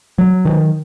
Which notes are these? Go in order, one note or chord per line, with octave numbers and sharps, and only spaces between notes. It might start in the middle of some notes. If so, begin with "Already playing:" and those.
F#3
D#3